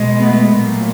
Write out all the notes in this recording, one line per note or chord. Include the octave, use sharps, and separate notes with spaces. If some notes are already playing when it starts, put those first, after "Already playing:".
Already playing: B2 G#3
A3 B3
A#2 F#3 A3